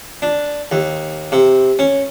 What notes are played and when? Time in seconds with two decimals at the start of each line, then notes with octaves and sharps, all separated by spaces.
0.22 D4
0.72 D#2
1.32 C3
1.79 C#4